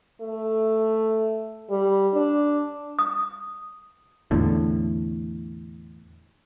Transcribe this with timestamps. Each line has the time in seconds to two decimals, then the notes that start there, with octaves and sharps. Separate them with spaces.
0.21 A3
1.70 G3
2.13 D4
2.99 D#6
4.31 E2 A2 D3